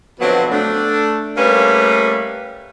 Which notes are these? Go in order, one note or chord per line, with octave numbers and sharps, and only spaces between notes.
B2 D3 F3 F#3 B3 C4
A3 D4
G3 A3 A#3 C#4 B4